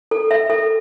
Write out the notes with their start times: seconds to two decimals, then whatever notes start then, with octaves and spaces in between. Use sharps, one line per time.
0.11 A4
0.31 E5
0.50 A4